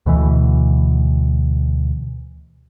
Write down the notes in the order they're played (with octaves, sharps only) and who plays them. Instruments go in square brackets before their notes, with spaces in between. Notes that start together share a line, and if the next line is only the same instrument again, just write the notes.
[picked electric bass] D2 B2 E3